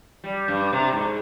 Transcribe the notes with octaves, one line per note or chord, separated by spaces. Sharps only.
G3
G2
C3
G#2